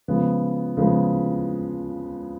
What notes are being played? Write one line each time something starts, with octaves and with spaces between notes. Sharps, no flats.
C#3 F3 G#3 B3
C#3 F3 G#3 B3